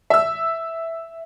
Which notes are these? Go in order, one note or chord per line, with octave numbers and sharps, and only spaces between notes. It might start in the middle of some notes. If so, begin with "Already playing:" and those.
E5 E6